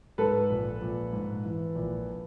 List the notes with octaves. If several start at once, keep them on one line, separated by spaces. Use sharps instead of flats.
G#2 A4 B4
A#1
A#1
G#2
E3
A#1